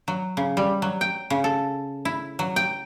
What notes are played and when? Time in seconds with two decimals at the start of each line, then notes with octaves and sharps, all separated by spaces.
0.08 F#3
0.37 C#3
0.57 G3
0.82 F#3
1.01 G5
1.30 C#3
1.44 A4
2.05 E4
2.39 F#3
2.56 G5